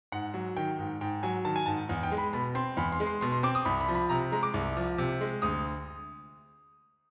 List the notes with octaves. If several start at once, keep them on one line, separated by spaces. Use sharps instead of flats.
G#2 F#5
F#3
D#3 G5
G#2
G#2 G5
F#3 G#5
D#3 A5
G#5
G#2 A5
E2
G5
G#3
B5
B2 B5
C4 C6
E2 B5
C6
G#3
C6
B2 C6
C6
C4 D6
D#6
C2 B5
B5
F3
B5
C3 A#5
G#3 A#5
D6
C2
F3
C3
G#3
D2 D#6